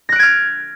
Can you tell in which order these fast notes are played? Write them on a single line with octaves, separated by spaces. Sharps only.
A#6 F#6 D7 G#6 F6